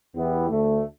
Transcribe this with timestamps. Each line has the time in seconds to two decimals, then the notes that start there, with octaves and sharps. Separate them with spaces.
0.15 E2 E3 B3 E4 G4
0.49 D2 D3 A3